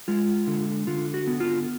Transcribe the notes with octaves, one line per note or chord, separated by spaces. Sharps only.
G#3 F4
D3
D3 F4
F#4
B3
F4